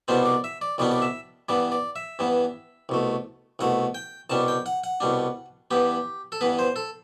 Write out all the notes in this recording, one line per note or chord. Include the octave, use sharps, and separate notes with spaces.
C2 B2 G3 B3 D4 C5
D5
E5
D5
C2 B2 G3 B3 D4 D5
D5
E5
G2 E3 B3 D5
D5
E5
G2 E3 B3
C2 B2 A3
C2 B2 A3 F#5
G5
C2 B2 G3 D4 A5
G5
F#5
F#5
C2 B2 G3 D4
G2 E3 B3 G4
A4
G2 E3 B3 B4
C5
A4